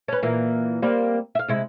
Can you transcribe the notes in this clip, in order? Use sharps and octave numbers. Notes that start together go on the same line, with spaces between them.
C#4 B4
A#2 E3 A#3
G3 A#3 C4
E5 F5
C3 G#3 E4